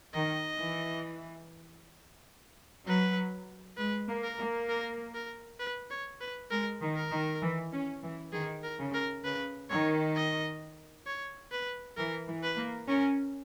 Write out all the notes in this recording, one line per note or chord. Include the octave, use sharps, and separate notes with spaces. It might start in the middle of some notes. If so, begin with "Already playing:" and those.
D#3 D#5
E3
F#3 B4
G#3 B4
A#3
A#4
A#3
A#4
A#4
B4
C#5
B4
G#3 A#4
D#3
A#4
D#3
E3
C#4
E3
D#3 G#4
A#4
C#3
A#4
C#3 B4
D#3 C#5
D#5
C#5
B4
E3 A#4
E3
B4
A#3
C#4 A#4